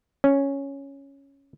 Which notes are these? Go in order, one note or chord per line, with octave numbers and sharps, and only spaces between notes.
C#4